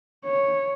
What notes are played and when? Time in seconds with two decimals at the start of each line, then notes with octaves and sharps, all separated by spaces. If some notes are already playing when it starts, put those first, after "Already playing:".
0.25 C#5